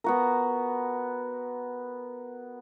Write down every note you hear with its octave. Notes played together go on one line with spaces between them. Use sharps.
B3 F#4 A#4